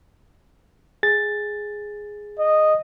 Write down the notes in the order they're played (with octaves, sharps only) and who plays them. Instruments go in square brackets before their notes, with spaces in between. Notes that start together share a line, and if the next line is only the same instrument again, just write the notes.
[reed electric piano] G#4 A6
[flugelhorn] D#5